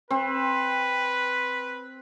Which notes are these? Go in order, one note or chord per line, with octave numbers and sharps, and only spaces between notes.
C4 B4